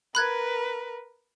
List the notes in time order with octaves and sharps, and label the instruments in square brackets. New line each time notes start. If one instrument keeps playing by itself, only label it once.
[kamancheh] A#4 B4 [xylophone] B5 F#6 G#6